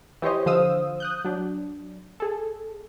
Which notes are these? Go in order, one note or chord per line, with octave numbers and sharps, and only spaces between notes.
E3 G4 C5 C#5 D#5
D3 F3 C5 F5 D#6 E6
D#6 F#6 G6
F#3 D4
G#4 A4